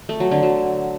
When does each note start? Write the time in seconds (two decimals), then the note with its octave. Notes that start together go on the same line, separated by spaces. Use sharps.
0.09 A3
0.20 F#3
0.31 D3
0.43 F#3